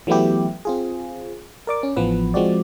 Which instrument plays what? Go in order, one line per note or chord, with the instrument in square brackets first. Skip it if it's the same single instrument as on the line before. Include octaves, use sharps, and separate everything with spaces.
[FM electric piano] E3 F#3 A3 B3 E4 G4
C4 F4 G#4
A#4 D5 D6
C#4
A1 E3 F3 B3 B4
F3 G#3 C4 F#4 D5